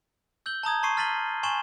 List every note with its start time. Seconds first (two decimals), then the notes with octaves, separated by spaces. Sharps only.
0.46 E6 G6 F#7 G7
0.63 A5 A#5 D#6 G#6
0.83 A5 C6 C#6 C7 D#7
0.97 F6 A6 B6 D#7 F#7 G7
1.43 G#5 C6 C#6 E7 F#7 G7